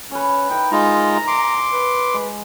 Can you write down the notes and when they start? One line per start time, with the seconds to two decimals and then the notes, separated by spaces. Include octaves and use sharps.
0.11 C#4 B4 C#5
0.50 D#4 E4 A#4 G5
0.72 G#3 D#4 F4 G#5 A#5
1.27 C6 D6
1.73 B4
2.14 G#3